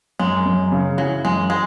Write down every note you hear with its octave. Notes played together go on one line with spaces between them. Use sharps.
F#2 G#3
F#2
C#3
E3 F#3
F#2 G#3
G#3